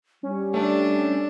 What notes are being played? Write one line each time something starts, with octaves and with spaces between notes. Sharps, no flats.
G3 C#4
A3 D4